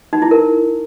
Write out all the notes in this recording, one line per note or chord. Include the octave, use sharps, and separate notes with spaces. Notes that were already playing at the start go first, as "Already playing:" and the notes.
D#4
E4
A#4